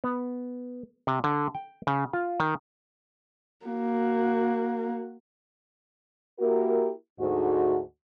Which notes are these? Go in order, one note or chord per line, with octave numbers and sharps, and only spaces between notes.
B3
C3
D3
G5
C#3
F4
D#3
A#3 F#4
A#3 E4 F#4 G4 A#4
D2 G#2 F#4